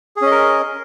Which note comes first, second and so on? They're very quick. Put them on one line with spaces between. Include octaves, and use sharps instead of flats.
G#4 C#4 D#5 A#4